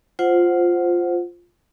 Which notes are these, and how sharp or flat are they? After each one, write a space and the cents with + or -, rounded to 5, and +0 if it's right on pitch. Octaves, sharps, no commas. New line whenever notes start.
F4 +0 C5 +0 F#5 -5